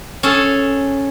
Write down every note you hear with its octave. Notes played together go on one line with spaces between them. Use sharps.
C#4 G#4 A4 A5